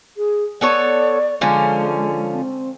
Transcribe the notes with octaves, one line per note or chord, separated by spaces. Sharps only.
G#4
B3 A4 C#5 D5
D3 F3 G#3 C#4
C4